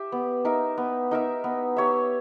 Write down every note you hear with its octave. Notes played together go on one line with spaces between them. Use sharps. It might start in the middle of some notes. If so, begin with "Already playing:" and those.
Already playing: G4 E5
B3
D#4 A#4 E5
B3
D#4 A#4 E5
B3
G4 C#5 E5